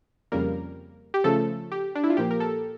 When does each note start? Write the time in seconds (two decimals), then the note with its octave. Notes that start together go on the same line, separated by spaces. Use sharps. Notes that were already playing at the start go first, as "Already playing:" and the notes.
0.32 F2 C#3 G3 A#3 A#4
1.14 G4
1.24 C#3 F3 A3 A4
1.72 G4
1.95 D4
2.04 E4
2.10 F4
2.17 A#2 F3 A#3 G4
2.31 A#4
2.40 A4